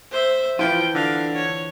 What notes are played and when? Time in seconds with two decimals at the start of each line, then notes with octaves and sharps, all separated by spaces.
0.11 C5 E5
0.59 E3 F3 E4 F4 G5
0.95 D3 F5
1.34 C#5